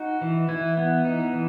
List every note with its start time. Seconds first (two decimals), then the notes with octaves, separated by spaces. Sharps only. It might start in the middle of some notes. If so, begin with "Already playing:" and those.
Already playing: D#4 F#4
0.21 E3
0.49 E3 E4
0.77 B3
1.05 D#4
1.33 E3